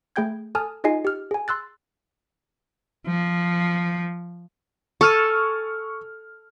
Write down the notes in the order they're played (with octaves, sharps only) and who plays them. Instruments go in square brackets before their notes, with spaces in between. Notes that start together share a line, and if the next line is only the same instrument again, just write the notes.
[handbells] A3 G#4 G5 G6 G#6
A4 G#5 A5 D#6 F6
D#4 F4 G#4 D#5 G#5 C7
G4 F6
G#4 G#5
C6 E6 F#6 A6
[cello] F3
[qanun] A4 G#5 [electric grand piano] C#6 F6